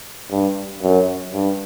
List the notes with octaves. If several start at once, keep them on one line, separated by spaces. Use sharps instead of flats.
G2
F#2
G2